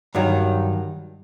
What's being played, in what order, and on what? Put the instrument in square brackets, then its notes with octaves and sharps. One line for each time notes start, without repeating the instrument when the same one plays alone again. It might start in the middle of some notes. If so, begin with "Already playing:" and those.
[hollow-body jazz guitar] G2 D#3 F#3